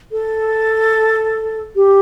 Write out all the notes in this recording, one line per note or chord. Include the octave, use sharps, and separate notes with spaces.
A4
G4